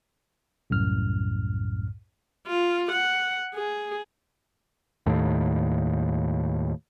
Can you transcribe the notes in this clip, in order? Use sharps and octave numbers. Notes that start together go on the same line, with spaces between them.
C2 F#2 A2 F6
F4
F#5
G#4
D#2 A2